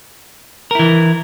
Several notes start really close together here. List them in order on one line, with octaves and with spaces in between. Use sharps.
A#4 E4 E3